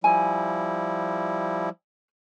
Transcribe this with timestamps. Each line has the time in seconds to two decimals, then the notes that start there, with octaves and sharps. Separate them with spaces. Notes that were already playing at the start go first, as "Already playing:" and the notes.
0.04 F3 G3 E4 G#5